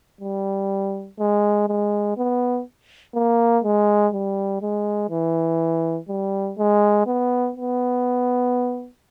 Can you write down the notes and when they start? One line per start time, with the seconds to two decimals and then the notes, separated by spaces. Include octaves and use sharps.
0.21 G3
1.19 G#3
1.68 G#3
2.17 B3
3.15 A#3
3.64 G#3
4.13 G3
4.62 G#3
5.10 E3
6.09 G3
6.58 G#3
7.07 B3
7.56 B3